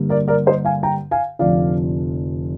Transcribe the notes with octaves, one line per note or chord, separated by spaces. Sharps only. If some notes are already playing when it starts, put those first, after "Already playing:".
Already playing: G2 D3 G3 A#3
A#4 D5
A#4 D5
C5 D#5
F5 G#5
G5 A#5
F5 G#5
F1 F2 D3 F3 D5 F5